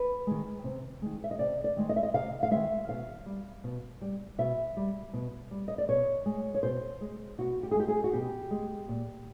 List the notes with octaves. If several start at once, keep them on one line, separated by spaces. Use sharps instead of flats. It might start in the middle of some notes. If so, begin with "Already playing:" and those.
Already playing: B4
D#3 G#3
C3
D#3 G#3
E5
D#5
C3 D5
D5
D#3 G#3
D#5
E5
D#5
C3 F5
F5
D#3 G#3 E5
B2 F5
G3
B2
G3
B2 E5
G3
B2
G3
D#5
D5
B2 C#5
G#3
C#5
B2 C5
G#3
B2 F#4
G4
G#4
G#3 G4
G#4
F#4
B2 G4
G#3
A#2